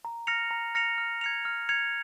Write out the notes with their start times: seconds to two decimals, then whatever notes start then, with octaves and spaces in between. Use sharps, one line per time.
0.05 A#5
0.27 F6 A#6 C#7 F7
0.51 A#5
0.75 F6 A#6 C#7 F7
0.98 F6
1.21 G#6 C#7 F7
1.45 F6
1.69 G#6 C#7 F7